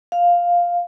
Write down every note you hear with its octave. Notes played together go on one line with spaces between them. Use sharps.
F5